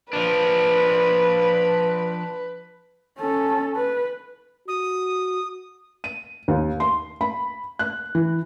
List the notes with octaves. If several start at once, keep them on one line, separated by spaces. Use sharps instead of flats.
F3 D4 B4
C#4 A4
B4
F#4 D#6
D#7
D#2
C6
B5
F#6
E3